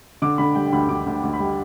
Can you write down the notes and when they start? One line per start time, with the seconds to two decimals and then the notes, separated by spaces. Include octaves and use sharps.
0.22 D3 D6
0.38 D3 B5
0.55 G3 G5
0.73 D2 B5
0.89 D2 D6
1.06 D2
1.23 D2
1.33 B5
1.40 G3